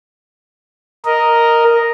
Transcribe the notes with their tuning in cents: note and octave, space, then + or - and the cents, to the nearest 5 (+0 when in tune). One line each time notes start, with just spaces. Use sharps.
A#4 +0 D#5 +0